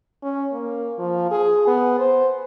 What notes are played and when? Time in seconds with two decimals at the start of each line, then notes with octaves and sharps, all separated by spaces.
0.23 C#4
0.53 A#3
0.98 F3
1.31 G#4
1.67 B3
2.00 C5